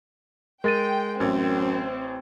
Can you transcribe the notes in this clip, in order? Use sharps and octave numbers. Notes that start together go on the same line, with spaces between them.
G#3 A#4 G5 A6 D#7
A1 F#2 C4